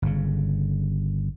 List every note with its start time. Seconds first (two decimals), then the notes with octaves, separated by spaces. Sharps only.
0.02 G1 C#3